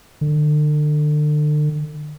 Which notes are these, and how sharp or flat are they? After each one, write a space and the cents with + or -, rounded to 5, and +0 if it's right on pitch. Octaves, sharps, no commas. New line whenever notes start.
D3 +35